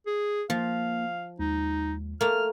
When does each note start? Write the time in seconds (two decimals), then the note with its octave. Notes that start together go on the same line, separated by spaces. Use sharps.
0.06 G#4
0.50 F3 A#3 F4 F5
1.39 D#2 G#3 D#4
2.21 A3 A#3 F6